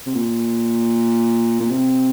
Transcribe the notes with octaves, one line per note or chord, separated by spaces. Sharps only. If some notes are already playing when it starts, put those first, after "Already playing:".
C3
A#2
A#2
C3